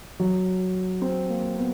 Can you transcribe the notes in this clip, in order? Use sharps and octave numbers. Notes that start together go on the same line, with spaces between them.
F#3
C4
A#3
B3